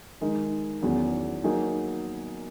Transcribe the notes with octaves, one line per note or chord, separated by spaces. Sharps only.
D#3 G#3 D#4 A#4
E2 D#3 F#3 C#4 G#4
F#3 A#3 D#4 G#4